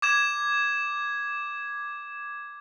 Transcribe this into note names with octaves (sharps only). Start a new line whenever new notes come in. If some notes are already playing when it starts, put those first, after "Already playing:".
D6 G#6 E7